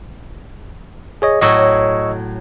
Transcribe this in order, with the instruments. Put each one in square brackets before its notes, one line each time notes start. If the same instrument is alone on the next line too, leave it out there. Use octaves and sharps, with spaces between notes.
[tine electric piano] G#4 C#5 D#5
[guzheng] A2 F#3 [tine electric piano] D#5 C#6 E6